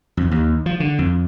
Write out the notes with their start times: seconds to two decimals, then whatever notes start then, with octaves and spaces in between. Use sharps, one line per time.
0.17 F2
0.31 D#2
0.66 F3
0.80 D3
0.99 F2